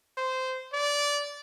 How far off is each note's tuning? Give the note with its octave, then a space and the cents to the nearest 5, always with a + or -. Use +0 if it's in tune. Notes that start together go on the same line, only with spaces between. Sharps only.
C5 -15
D5 -20